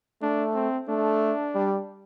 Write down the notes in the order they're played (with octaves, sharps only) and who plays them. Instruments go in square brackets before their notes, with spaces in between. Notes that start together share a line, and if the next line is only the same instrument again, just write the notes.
[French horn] A3 [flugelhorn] D4
[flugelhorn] C4
[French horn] A3 [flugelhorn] D4
[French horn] G3